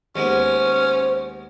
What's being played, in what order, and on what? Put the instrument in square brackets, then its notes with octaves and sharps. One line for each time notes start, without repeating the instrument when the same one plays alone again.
[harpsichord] D#2 G#3 B3 [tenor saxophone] C#4 [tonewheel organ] C5